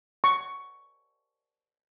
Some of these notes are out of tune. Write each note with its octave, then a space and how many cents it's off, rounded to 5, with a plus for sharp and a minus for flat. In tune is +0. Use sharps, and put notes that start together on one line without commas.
C#6 +5